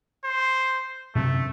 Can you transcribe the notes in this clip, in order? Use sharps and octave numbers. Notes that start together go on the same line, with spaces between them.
C5
F#2 C3 A3 C4